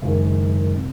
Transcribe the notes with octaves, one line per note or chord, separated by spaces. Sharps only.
F#1 F#2 D#3 G#3
C3